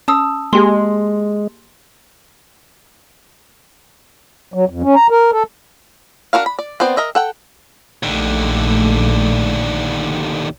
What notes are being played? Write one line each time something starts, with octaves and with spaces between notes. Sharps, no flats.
C#4 A5 D#6 E6
G#3 A#3 G4 G#4 C6
F#3
F2
C#4
A#5
A#4
A4
D4 F#4 A#4 F5
B5
D5
B3 C4 C5 D5
A#4 D#5 E5
A4 F#5 G5
A#1 D#2 D3 A3